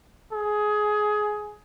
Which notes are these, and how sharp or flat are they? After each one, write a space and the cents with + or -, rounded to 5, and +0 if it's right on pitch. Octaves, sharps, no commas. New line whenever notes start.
G#4 +15